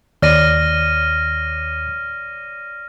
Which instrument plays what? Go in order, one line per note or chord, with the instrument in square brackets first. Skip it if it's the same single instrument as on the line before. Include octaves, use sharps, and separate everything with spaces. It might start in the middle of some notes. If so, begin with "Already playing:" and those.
[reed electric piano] D#2 [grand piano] C#5 D5 [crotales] F6 A#6 D#7